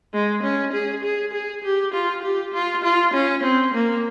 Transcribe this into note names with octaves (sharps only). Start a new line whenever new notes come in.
G#3
C#4
G#4
G#4
G#4
G4
F4
G4
F4
F4
C#4
C4
A#3